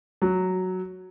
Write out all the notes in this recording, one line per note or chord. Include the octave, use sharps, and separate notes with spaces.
F#3